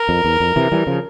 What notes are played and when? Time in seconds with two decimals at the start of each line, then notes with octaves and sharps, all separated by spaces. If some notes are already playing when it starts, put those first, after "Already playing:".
Already playing: A#4
0.09 F2
0.25 E2
0.40 F2
0.56 C3 E3
0.72 E3 G3
0.87 C#3 F3